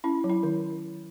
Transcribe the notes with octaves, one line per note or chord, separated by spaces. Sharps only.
C#4 E4
F#3
E4
D#3